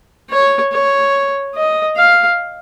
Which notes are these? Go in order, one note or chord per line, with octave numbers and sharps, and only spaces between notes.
C#5
C#5
D#5
F5